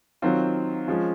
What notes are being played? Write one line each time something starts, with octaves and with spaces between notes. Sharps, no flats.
D#3 F#3 C4 F4
F3 G#3 C#4 F4